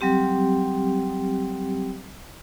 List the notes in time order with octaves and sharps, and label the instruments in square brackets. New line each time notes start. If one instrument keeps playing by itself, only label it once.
[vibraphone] F#3 G3 C4 G4